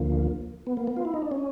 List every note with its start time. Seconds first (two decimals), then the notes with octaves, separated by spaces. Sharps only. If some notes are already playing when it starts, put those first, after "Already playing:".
Already playing: D2 D3 F3 A#3
0.67 B3
0.77 A#3
0.87 B3
0.96 F4
1.05 E4
1.14 D#4
1.22 D4
1.31 C#4